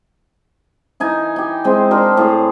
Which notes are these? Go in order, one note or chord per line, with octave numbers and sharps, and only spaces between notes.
E3 D#4 G#5
G4 G#5
G#3 C4
D4 G4 A#4 C5
A2 G#4